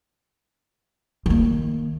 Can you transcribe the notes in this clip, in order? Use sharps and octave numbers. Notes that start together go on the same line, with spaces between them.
D#3 A#3